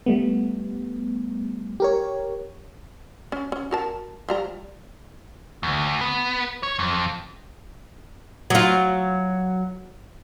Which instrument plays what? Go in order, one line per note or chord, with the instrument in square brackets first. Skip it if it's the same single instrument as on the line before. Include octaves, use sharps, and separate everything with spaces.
[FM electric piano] G3 A3 B3
G4 A#4 C#5
[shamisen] C#4
C#4
F#4 A#4 A5
F3 G3 A#5
[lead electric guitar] D2
B3
C#5
F2
[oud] F#3 F4